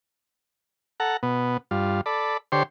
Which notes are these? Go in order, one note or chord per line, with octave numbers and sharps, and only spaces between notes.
A4 F#5 A#5
B2 B3
G2 F4
A4 D5 B5
D3 G4 C5 C#5 C6